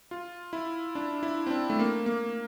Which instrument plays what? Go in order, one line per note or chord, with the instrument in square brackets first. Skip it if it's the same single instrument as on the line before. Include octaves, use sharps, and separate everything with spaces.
[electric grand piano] F4
E4
D4
E4
C4
D4
A3
A#3
A#3